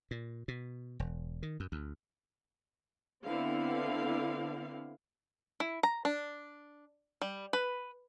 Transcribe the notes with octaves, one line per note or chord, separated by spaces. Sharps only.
A#2
B2
E1
D#3
F#2
D2
D3 B3 C4 E4 F5
E4
A#5
D4
G3
B4